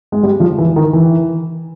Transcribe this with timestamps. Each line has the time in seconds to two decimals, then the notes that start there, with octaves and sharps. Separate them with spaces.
0.12 G#3
0.23 G3
0.40 F3
0.58 E3
0.76 D#3
0.93 E3